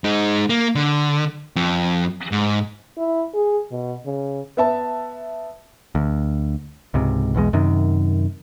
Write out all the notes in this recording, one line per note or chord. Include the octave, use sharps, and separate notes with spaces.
G#3 D#4
A#3
D3
F2
G#2
E4
G#4
B2
C#3
B3 E5 A5
D2
C#2 G#2 C3
B1 E2 B2 G#3
F#2 C3 D#3